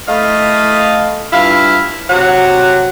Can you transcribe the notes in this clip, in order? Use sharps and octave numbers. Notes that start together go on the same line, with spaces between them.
A3 E4 D#5 F5
G2 E4 F4 F5
C3 F#3 F#5